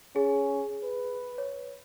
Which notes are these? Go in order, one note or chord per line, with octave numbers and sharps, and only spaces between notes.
C#4 G#4
B4
C#5